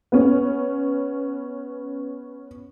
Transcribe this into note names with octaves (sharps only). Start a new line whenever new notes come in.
B3 C#4